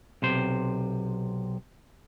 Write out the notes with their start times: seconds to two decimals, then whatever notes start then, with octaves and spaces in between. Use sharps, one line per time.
0.22 B1 C3 C5